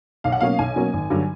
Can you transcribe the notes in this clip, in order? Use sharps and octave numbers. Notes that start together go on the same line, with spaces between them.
B1 F5
F#5
B2 F#3 A#3 C#4 F5
B1 G#5
B2 F#3 A#3 C#4
G#1
G2 D3 F#3